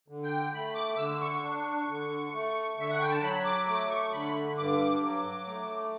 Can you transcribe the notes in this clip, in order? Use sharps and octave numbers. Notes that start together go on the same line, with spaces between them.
D3
G5
A3 B5
D6
D6
D3 E6
C#6
D4
D3
A3
D3 E5
F#5
G5
A5
F#3 B5
D6
A3 D6
C#6
D3 B5
G2 D6
F#3
A3